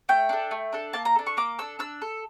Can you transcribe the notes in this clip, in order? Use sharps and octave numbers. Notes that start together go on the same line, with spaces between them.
A3 G5
D4 A4
A3
D4 A4
A#3 A5
A#5
D4 A4
C#6
A#3 D6
D4 A4 E6
D4 E6
A4